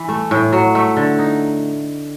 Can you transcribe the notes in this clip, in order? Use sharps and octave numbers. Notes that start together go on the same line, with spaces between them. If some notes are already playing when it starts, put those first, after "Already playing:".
Already playing: E3
A3
A2
F#3
A3
D3
D#4